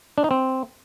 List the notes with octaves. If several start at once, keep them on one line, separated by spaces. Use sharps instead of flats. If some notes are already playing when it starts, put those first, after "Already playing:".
D4
D#4
C4